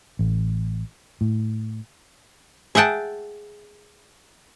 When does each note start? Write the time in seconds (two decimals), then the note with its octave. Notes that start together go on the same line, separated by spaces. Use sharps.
0.19 A1
1.21 A2
2.75 G#4 E5 F#5 G5 A5